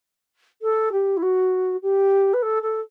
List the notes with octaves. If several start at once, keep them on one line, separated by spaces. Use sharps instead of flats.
A4
G4
E4
F#4
G4
B4
A4
A4